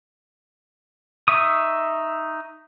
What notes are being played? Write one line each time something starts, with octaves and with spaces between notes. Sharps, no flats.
D#4 E5 C#6 D#6